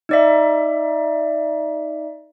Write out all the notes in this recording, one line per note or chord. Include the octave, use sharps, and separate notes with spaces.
D#4 D5 E5